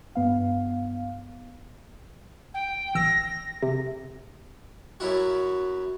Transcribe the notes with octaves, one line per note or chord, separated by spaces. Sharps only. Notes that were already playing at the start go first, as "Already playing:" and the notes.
G2 B3 F5
G5
A1 E6 A#6
C3
F#2 F#3 E4 F#4